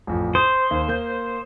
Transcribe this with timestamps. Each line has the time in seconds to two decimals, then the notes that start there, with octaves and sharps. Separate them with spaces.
0.07 A1 F2
0.35 C5 D#6
0.71 D#2
0.88 A#3 G6